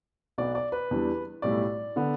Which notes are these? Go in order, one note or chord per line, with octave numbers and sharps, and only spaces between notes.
B1 B2 B3 D5
D5
B4
E2 E3 G3 D4
B1 A2 G3 E4 D5
D3 B3